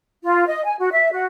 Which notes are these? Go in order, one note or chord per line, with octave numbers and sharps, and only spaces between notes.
F4
D#5
G#5
F#4
E5
F#4